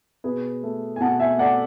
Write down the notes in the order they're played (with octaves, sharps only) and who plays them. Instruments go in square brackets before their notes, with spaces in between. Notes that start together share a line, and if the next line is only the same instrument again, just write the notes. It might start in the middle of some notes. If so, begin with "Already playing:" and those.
[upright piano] B2 G#4 B4
A3
G#5
B2 F#5 A5
E5 G#5
A3 D5 F#5